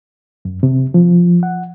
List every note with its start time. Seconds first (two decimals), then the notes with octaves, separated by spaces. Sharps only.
0.45 F#2
0.63 C3
0.94 F3
1.43 F#5